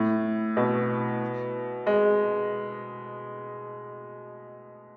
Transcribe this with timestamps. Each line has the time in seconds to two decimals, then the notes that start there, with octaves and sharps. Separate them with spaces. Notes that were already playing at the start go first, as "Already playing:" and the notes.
Already playing: A2
0.57 B2
1.87 G#3